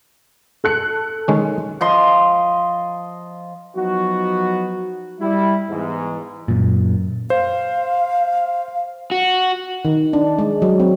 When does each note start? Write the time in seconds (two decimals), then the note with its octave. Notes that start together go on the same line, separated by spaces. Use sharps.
0.64 A4 F#6 C#7
1.28 D#3 G#3 C#4
1.81 F3 D#5 C6
3.76 F3 F#3 B3 D#4 F#4
5.20 G3 E4
5.70 E2 G#2
6.48 F#2 A#2
7.30 C5 F5
9.11 F#4
9.85 D#3
10.13 D4
10.39 G#3
10.62 F#3
10.80 C4